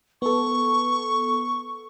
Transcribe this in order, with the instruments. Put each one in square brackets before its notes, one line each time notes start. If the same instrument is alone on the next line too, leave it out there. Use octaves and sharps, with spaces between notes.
[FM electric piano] B3 A4 [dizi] C#6